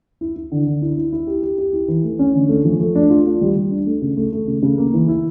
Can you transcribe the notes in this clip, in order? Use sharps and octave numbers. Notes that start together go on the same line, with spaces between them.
E4
E4
D3
D3
E4
E4
E4
G4
G4
G4
E4
E3
A3
C#4
D3
A3
F3
A3
D4
F4
F4
G3
G3
D4
A3
C#3
A3
A3
C#3
C#3
A#3
E3
E4